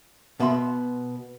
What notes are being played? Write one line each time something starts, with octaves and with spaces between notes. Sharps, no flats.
B2 B3 E5 B5 C6